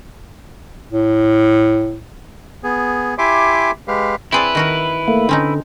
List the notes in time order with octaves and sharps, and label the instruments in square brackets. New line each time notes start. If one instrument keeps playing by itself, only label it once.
[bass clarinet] A2
[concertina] B3 G#4
E4 G4 E5 G#5 C6 D6
G#3 G4 B4 F5
[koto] C4 G#4 D5 [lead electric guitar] E4 B4
[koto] D#3 F#4 A#4
[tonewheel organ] A3 A#3
[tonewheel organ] D3 [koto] C4 C#4 D#4